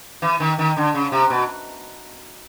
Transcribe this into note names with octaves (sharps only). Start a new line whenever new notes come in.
E3
D#3
D#3
D3
C#3
C3
B2